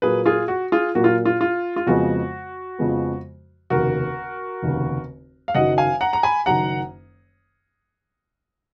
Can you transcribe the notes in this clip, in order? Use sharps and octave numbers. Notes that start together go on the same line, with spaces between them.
A#2 F#3 A#3 G#4 B4
F4 G#4
F#4
F4 G#4
A#2 F#3 A#3 F#4
F4
F4
F4
F4
F2 C#3 F3 G#3 B3 F#4
F2 C#3 F3 G#3 B3
F1 D#2 C#3 F#4 A#4
F1 D#2 C#3
F5
F#1 F#2 D#3 F#3 D#5 F#5
F5 G#5
F#5 A#5
A#5
G#5 B5
F#1 F#2 D#3 F#3 F#5 A#5